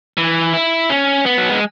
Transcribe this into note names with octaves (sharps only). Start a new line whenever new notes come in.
E3
E4
C#4
B3
F#3
G#3